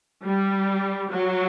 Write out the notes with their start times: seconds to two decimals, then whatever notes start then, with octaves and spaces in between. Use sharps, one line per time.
0.22 G3
1.08 F#3